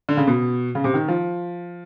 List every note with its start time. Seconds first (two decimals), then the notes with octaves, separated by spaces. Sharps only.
0.09 D3
0.17 C#3
0.27 B2
0.75 C#3
0.84 C3
0.94 D#3
1.08 F3